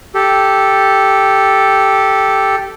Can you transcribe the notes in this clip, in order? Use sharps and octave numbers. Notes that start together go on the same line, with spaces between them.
G4 A4